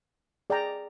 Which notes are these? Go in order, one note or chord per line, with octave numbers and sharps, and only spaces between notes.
G#4 D5 G5 A#5